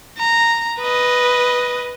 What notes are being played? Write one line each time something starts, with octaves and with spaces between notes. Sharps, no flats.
A#5
B4 D#5